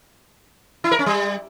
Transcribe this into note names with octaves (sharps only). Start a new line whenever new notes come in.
E4
A#4
C#4
G3